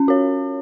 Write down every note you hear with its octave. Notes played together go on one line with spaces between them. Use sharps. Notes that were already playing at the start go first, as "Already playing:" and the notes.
Already playing: C#4
F#4 C#5